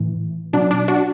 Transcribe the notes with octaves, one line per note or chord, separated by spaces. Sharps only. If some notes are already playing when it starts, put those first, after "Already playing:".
Already playing: A2 E3
B2 F#3 D4
D4
D4 F#4